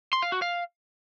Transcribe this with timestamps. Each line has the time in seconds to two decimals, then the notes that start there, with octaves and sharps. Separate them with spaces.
0.13 C6
0.22 F5
0.32 F#4
0.42 F5